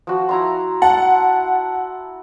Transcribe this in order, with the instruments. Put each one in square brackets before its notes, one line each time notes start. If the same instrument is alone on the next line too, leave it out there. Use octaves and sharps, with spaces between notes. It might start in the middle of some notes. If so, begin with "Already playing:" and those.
[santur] F3 F#4
E4 A#5 C6
[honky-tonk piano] F#5 [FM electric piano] A5